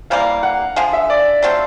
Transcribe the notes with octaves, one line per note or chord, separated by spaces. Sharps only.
C3 E3 G3 A#3 F5
F#5
D3 F3 G#3 F5
E5
D5
F#3 A3 C4 F4